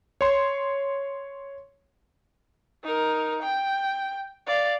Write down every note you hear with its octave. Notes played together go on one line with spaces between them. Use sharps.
C#5 C6
D#4 A#4
G5
D5 F5